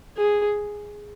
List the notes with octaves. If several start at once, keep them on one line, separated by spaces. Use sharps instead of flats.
G#4